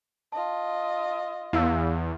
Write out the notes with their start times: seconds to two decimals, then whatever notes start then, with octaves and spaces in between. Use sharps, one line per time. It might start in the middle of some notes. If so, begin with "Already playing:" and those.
0.32 F4 D#5 A5
1.53 E2 E4 F5 E6